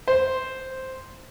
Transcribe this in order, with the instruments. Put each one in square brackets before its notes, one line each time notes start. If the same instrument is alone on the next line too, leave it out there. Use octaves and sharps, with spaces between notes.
[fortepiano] C5